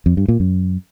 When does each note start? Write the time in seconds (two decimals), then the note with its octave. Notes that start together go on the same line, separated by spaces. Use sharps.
0.06 F2
0.17 G2
0.28 A#2
0.40 F#2